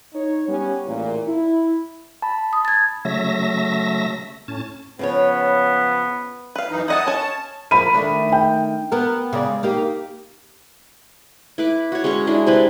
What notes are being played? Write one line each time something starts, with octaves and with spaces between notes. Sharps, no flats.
D#4 C#5
G3 B3 C#4 G4
A1 E2 A#2
E4
A5 B5
D#6
G#6 A6
C#3 F#3 A3 E5 A#6
A2 C#4 A5
C#3 F3 B3 C#5
B4 F5
F#2 E3 D#4
E4 D#5 F#5 A5 D#6
C#4 C#5 A5
F3 A#3 B5 D#7
D#3 A3 D4
G5
B3 A#4
C#3 G#3 D5
A#3 D#4 G4
E4 B4 D6
F#4 C#5
G#3 C#4 A#5 C#6
G#3 D4 E4
C3 C4 E4 B4